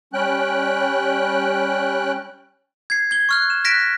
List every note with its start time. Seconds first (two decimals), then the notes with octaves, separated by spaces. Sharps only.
0.13 G3 C#4 G5 F#6
2.90 G#6 C7
3.11 G#6 G7
3.29 C#6 F6 F#6
3.50 E7
3.64 F#6 A#6 B6 D7 E7